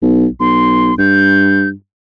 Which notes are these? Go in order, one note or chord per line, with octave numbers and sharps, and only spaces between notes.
B1
B1 C6
G2 G6